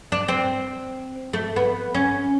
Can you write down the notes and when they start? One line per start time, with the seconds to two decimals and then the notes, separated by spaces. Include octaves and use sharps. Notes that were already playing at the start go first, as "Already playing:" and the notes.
0.12 D4
0.28 C4
1.33 A3
1.56 B3
1.94 C#4